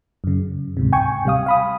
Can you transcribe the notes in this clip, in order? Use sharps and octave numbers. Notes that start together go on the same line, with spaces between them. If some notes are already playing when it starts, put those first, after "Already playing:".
F#2 C#3
D2 G#2 C3
G5 G#5 C#6
C3 G3 F5 D#6
F5 B5 D#6